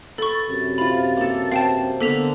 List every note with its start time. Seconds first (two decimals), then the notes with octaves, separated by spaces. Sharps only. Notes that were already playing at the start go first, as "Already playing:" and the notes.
0.18 A4 B5 C#6 A6
0.48 F#2 C3
0.78 F4 F5 B5
1.17 A#3 A4
1.52 C4 F5 G5 A5
2.01 D3 A#3 B3 A4 B6 F7